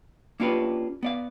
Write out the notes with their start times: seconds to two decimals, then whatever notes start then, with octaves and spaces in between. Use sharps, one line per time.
0.40 A#3 C#4 D4 F4 G4 B4
1.03 B3 D5 F5